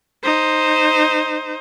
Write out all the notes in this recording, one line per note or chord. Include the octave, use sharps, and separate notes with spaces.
D#4 C5